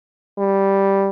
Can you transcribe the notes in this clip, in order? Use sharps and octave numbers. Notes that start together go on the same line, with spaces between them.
G3